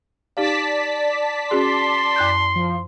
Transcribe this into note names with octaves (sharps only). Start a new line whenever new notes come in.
D#4 G4 D5 F5 A5 B6
C#4 F#4 G#4 C6
F#2 F#6 G6
F3